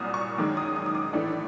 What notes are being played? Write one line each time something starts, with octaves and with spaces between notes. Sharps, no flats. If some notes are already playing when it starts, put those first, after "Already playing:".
Already playing: C2 A#2 F#3 D#6 F6
C#6
F#2 D#3 G#3 D6
D#6
D#6
D#6
D6
A2 E3 A3 D4